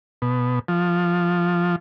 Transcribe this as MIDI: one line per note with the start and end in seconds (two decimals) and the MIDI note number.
0.22 0.59 47
0.68 1.76 53